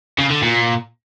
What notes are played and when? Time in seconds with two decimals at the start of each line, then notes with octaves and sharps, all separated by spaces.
0.18 C#3
0.30 D3
0.42 A#2